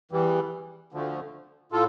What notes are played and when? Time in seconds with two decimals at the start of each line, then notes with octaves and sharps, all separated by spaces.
0.11 E2 E3 G3
0.92 D2 D3 F3 A3
1.72 A2 F4 A4